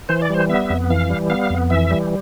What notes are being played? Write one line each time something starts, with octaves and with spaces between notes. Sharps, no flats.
E3 C5
D5
G3 C5
B3 E5
F2
E3 F5
G3
B3 F5
F2
E3 E5
G3